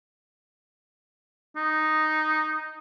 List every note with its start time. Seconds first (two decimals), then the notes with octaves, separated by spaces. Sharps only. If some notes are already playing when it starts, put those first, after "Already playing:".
1.56 D#4